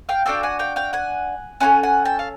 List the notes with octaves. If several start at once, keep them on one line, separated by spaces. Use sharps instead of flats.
F5 G5
D4 F#4 A4 F5 G5
F#5 G#5
F5 G5
F5 G5
F#5 G#5
C#4 F4 A4 F#5 G#5
F#5 G#5
G5 A5
F5